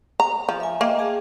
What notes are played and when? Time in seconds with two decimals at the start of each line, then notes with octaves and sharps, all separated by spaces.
0.20 A#5
0.49 F3
0.60 E5 G#5
0.81 A#3 D#5 F5 G5
0.99 G#4 F5 A5